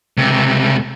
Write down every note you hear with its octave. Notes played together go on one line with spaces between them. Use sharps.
C#2 C3